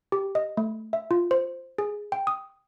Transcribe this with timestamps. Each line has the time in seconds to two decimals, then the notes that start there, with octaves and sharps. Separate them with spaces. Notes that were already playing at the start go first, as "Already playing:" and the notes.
0.12 G4
0.35 D#5
0.57 A3
0.93 E5
1.11 F4
1.31 C5
1.78 G#4
2.12 G5
2.27 D#6